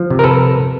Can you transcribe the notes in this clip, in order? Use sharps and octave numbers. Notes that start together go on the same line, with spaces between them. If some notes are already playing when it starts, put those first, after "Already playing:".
Already playing: F3
C3
A#4
A4 B4